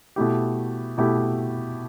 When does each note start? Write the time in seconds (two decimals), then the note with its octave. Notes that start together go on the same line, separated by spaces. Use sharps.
0.16 B2 A3 E4 G4
0.98 B2 A3 E4 G4